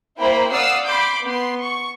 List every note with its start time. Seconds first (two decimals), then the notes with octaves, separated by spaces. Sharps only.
0.19 A#3 E4 C5 G5 A#5 B5
0.51 D5 F5 F#5 D#6 E6 C7
0.86 B5 C6 D6 G6
1.23 B3 B4 C6
1.62 C#6